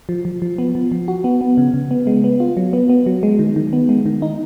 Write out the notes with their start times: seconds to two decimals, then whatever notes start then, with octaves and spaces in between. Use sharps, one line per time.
0.09 F3
0.25 F3
0.42 F3
0.58 B3
0.75 F3
0.92 F3
1.08 F#4
1.24 B3
1.41 B3
1.58 C#3
1.74 C#3
1.91 B3
2.07 G#3
2.24 B3
2.40 F4
2.57 F#3
2.73 B3
2.89 B3
3.06 F#3
3.23 G#3
3.39 D#3
3.56 D#3
3.73 B3
3.89 G#3
4.06 D#3
4.22 D#4